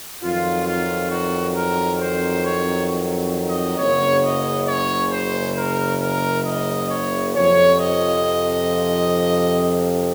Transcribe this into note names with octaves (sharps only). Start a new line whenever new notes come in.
F2 D#3 F#3 F4
F4
F#4
A#4
C5
C#5
D#5
F#1 F#2 C#3 C#5
D#5
C#5
C5
A#4
A#4
D#5
C#5
F2 C3 F3 C#5
D#5